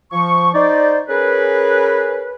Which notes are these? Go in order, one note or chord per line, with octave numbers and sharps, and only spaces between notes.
F3 C#6
D#4 C5 D5
C#4 G#4 A#4 B4